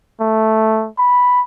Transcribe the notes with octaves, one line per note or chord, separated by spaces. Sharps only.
A3
B5